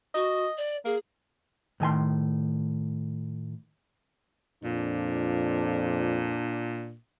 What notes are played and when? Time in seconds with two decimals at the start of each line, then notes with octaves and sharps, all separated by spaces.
0.15 F#4 D#5
0.57 D5
0.85 A#3 G#4
1.80 A2 D#3 G#5 C6
4.63 F2 A#2 D4